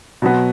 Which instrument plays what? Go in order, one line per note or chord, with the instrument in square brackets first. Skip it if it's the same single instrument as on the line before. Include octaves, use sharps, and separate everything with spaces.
[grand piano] B2 F#3 B3